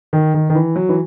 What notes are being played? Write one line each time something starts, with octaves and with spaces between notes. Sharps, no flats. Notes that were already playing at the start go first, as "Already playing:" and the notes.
D#3
D#3
D#3
E3
F#3
E3